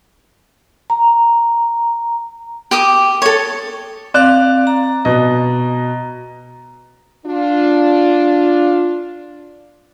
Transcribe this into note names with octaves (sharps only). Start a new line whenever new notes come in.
A#5
G4 D6 D#6
A4 C#5
C4 D5 F5 F#6
A#5
B2 D#5
D4 F4